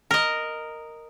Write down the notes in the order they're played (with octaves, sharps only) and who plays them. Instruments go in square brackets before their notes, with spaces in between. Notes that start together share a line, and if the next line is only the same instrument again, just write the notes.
[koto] A#4 D#5